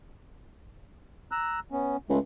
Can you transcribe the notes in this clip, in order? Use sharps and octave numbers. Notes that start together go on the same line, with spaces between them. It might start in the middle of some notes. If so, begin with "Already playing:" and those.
A#5 E6 F#6
B3 C#4
C#2 G#3 A3